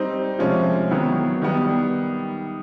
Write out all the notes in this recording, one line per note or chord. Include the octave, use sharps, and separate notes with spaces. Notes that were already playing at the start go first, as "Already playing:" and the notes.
Already playing: G3 C4 D#4
C3 F3 G#3 C#4
D#3 F#3 B3 E4
D#3 G3 B3